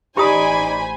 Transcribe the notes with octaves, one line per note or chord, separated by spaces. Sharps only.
A1 D#4 G4 C5 D5 G#5 B5 D#6